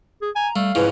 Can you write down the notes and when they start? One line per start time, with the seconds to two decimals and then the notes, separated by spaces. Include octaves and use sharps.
0.22 G#4
0.35 G#5 A#5
0.56 G3 A3 F5
0.75 G#2 C#3 F3 E4 B4